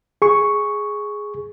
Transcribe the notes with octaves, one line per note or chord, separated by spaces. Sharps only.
G#4 C#6